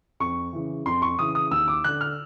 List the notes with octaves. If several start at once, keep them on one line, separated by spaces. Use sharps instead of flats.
F2 C#6
C#3 E3
F2 C6
C#6
C#3 E3 D#6
D#6
D#2 E6
D6
D3 F#6
F6